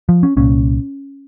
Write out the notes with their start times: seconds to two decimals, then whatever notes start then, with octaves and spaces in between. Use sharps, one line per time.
0.09 F3
0.23 C#4
0.37 C2 A#2 C#4